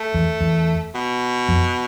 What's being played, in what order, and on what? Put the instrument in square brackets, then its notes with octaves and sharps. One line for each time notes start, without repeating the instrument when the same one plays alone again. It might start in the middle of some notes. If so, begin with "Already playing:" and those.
Already playing: [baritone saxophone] A3
[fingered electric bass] E2
E2
[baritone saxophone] B2
[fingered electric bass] F2